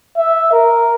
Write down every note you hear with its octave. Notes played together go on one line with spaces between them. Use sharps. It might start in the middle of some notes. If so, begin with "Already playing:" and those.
E5
A#4